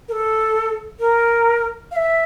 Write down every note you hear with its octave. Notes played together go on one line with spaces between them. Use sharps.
A#4
A4
A#4
F5
E5